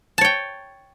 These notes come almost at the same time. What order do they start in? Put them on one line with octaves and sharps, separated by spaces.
A5 C#5 G5